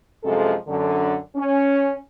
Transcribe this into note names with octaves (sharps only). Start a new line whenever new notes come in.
F#2 C3 F3 G#3 A4
F#2 D3
C#4